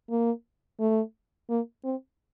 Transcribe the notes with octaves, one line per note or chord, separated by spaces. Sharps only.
A#3
A3
A#3
C4